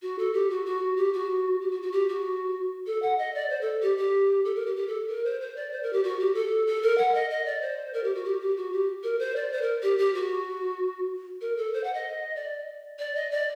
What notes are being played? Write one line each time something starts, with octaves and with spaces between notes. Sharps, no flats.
F#4
A4
G4
F#4
F#4
G4
F#4
G4
F#4
F#4
G4
F#4
A4
F#5
D#5
D5
C5
A4
G4
G4
A4
A#4
G4
G4
A4
A#4
C5
C5
D5
C5
A#4
G4
F#4
G4
A4
A4
A#4
F#5
D#5
D#5
D5
C5
A#4
G4
F#4
G4
G4
F#4
G4
A#4
C5
D5
C5
A#4
G4
G4
F#4
A#4
A4
C5
F#5
D#5
D5
D5
D#5
D5